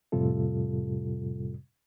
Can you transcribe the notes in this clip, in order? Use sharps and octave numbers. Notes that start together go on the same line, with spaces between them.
F2 A2 C3 G3 F4 A4